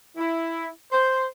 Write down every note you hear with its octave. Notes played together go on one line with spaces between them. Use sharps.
E4
C5